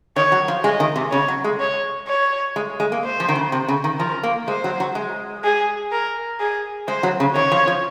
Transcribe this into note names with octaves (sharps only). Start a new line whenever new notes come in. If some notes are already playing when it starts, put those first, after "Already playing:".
D#3 C#5
F#3
F3
G#3 D#5
D#3
C3
C#3 C#5
F#3
G#3
C#5
C#5
G#3
G#3
A#3
C5
F3
D#3
C#3
C3
C#3
D#3
F3 A#4
A#3
G#3 C5
F#3
F#3
G#3
G#4
A#4
G#4
G#3 C5
F#3
C#3
D#3 C#5
F3
F3